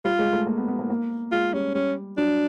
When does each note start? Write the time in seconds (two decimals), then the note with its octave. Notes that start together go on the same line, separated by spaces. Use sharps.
0.05 G3 F4
0.19 G#3
0.33 A3
0.47 A#3
0.58 B3
0.68 B3
0.79 A#3
0.90 A#3
1.32 G#3 F4
1.53 G3 C#4
1.74 G3 C#4
2.17 F#3 D4